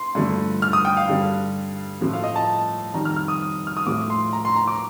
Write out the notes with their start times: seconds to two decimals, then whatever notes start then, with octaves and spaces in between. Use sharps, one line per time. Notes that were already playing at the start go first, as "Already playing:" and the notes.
Already playing: C6
0.15 G2 D3 F3 A3
0.62 F6
0.73 D#6
0.85 G5
0.97 F5
1.08 G2 D3 G3
2.01 A2 F3 A3
2.13 F5
2.24 D#5
2.36 A5
2.94 F2 D#3 G3 A#5
3.05 F6
3.16 F6
3.28 D#6
3.67 F6
3.77 D#6
3.87 A2 F3 A3 D6
4.10 C6
4.33 A#5
4.45 C6
4.56 A#5
4.68 D6